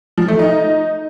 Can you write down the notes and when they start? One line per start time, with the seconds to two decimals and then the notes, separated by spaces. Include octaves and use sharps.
0.18 F3
0.28 A3
0.39 D#4